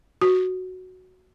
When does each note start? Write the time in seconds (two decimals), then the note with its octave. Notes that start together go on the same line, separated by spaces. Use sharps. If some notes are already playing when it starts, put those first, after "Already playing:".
0.22 F#4